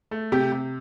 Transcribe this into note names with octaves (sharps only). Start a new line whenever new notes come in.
A3
C3 G4
C3